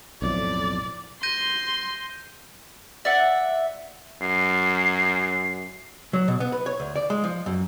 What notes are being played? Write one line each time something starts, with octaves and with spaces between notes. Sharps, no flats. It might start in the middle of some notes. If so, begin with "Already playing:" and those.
B1 F2 A2 D5
C6 G6 A#6 D#7
D5 E5 F#5
F#2 C7
F#3
B2
B3
B4
C#5
D2
D5
G#3
F3
F#2